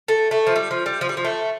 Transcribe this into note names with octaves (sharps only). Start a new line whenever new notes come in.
A3
A3
F3
G3
F3
G3
F3
G3
F3
A3